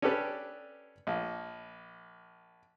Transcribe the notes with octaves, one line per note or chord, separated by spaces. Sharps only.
C#4 D4 G4 A4 B4 D5
A#1